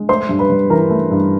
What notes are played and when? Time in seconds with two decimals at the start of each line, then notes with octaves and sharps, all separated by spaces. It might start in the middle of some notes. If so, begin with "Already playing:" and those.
Already playing: G#3
0.09 A3 C5 C6
0.29 G2
0.39 B4 B5
0.50 G2
0.70 E3 A#4 A#5
0.90 A3
1.11 G2